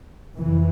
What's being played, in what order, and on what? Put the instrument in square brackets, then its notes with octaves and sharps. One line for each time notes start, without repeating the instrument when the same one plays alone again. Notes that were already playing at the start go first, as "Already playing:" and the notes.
[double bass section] F2 C3 E3